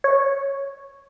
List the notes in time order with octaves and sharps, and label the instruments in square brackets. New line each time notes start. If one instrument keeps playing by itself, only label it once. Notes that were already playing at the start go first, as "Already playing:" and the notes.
[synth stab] C#5